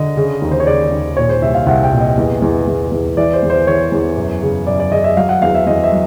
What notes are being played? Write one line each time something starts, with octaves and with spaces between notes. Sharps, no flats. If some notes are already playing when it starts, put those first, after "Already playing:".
Already playing: D3 D#5
C#3
D#2
C5
C#5
C#3 D5
D#2
A#2 C#5
C5
C2 E5
F5
C2 F#5
G5
A#2
D#5
E2
E2
E2
E2
E3 D5
C5
E2
C5
E3 C#5
E2
F#2
C#3
F#2 D5
D5
C#3 D#5
E5
F#3 F5
F#5
E2 F5
E5
E2 D#5
E5
F#3